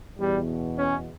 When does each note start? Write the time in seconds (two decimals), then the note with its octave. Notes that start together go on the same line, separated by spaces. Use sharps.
0.19 E2 B2 G3
0.77 C#4